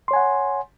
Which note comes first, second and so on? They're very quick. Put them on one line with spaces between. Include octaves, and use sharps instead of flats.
C6 C#5 G#5 F#5